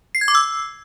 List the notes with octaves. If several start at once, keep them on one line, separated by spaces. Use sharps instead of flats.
C7
G#6
D6
E6